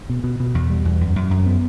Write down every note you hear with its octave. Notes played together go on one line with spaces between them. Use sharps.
B2
B2
B2
E2
G3
E2
F#2
F#2
F#2
B3